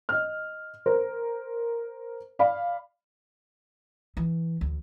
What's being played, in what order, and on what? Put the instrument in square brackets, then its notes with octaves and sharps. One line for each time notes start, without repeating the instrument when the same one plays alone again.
[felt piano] D#5 F6
A#4 C5
D5 F5 B5
[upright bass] E3
D2